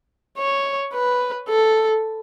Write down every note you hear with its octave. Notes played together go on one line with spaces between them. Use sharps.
C#5
B4
A4